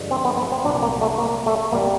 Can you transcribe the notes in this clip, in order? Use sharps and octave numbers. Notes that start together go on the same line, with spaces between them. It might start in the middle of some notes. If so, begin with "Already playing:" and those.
Already playing: G2 D3 F3 G#3
C4
B3
B3
C4
C2 A#2 F#3 D4
A#3
A3
A#3
A3
C2 B2 G3 A#3